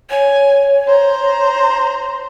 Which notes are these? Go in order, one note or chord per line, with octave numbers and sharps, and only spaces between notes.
C#5 G#5
C5 A#5